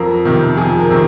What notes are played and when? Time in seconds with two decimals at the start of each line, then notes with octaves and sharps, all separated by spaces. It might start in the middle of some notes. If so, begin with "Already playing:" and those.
Already playing: F2 A#4
0.25 C3 D#3
0.57 F2 G#4
0.79 A#4
0.90 C3 D#3